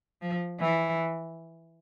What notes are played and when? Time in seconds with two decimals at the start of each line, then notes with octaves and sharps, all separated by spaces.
0.22 F3
0.60 E3